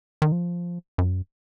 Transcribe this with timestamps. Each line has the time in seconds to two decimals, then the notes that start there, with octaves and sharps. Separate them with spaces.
0.22 D#3
0.32 F3
0.98 F#2